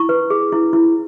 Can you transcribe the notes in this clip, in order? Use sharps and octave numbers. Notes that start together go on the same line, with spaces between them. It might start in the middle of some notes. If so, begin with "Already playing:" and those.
Already playing: E4 C#6
B4
G#4
E4
E4